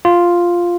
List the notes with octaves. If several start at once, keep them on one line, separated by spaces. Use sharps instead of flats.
F4